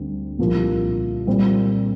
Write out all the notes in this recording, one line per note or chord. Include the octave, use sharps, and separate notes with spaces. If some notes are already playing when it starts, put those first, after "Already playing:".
Already playing: D2 D3 G3 C4
C2 A#2 F3 A#3
A#2 G3 C4